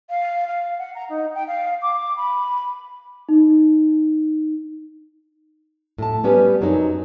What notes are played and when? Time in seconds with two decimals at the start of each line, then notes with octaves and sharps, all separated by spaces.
0.09 F5
0.47 F5
0.78 F#5
0.94 A#5
1.09 D#4
1.34 G5
1.47 F5
1.82 D6
2.16 B5
3.29 D#4
5.98 A2 A5
6.24 G3 B3 C#4 G4 B4
6.61 F#2 F#3 C4 D#4